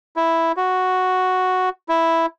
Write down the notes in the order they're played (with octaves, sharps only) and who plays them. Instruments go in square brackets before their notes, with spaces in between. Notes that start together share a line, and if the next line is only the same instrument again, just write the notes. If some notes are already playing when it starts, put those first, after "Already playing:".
[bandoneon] E4
F#4
E4